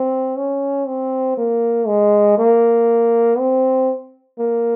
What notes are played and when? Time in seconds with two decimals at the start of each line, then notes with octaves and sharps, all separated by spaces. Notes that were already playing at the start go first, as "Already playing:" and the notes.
Already playing: C4
0.37 C#4
0.87 C4
1.37 A#3
1.87 G#3
2.38 A#3
3.39 C4
4.39 A#3